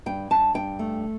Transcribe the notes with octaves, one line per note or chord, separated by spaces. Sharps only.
G2 G5
G2 A5
G2 G5
A3